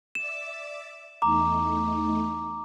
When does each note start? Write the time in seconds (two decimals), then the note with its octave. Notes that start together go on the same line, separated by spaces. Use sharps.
0.15 D5 E5 D6 E7
1.22 E2 A3 D#4 A#5 D6